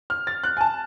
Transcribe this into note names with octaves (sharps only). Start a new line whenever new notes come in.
F6
A6
F#6
G#5
A5